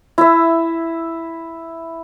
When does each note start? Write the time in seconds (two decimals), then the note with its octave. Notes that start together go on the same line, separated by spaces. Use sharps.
0.18 E4 E5